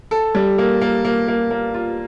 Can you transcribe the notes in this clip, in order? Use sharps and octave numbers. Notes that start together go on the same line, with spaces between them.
A4
G3
A#3
A#3
A#3
A#3
A#3
F4